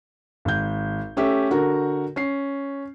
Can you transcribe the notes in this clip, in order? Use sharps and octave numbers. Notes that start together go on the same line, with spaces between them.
G#1 G6
A3 C#4 G4 E5
D3 F#4 A#4
C#4 C7